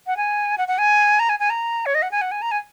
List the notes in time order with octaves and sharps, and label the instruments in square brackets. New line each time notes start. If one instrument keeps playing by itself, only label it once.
[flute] F#5
G#5
F#5
F#5
G#5
A#5
G#5
G#5
A#5
C#5
D#5
F#5
G#5
F#5
G#5
A#5
G#5